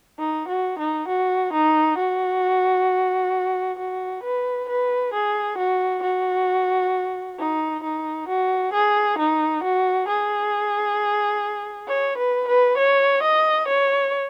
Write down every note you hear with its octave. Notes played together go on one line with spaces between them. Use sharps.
D#4
F#4
D#4
F#4
D#4
F#4
F#4
B4
B4
G#4
F#4
F#4
D#4
D#4
F#4
G#4
D#4
F#4
G#4
C#5
B4
B4
C#5
D#5
C#5